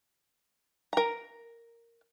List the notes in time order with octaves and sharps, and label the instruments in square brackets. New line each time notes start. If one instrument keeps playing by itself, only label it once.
[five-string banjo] A#4 A#5